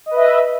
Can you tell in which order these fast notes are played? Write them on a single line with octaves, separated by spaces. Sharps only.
D#5 B4 E5